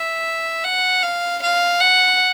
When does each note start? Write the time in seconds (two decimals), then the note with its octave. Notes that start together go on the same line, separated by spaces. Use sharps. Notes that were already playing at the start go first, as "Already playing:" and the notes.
Already playing: E5
0.64 F#5
1.03 F5
1.42 F5
1.81 F#5